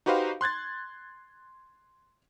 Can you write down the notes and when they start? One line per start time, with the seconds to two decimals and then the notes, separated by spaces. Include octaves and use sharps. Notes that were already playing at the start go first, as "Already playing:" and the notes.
0.06 D#4 F#4 G4 B4 C5 F5
0.41 C6 F#6 G#6 A6